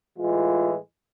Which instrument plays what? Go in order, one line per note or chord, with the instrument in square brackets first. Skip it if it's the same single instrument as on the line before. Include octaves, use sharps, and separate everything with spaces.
[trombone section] A2 E3 G#3 F4